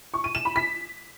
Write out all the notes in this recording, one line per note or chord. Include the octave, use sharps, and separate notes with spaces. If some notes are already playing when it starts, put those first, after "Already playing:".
C#6
D#7
E7
B5
B6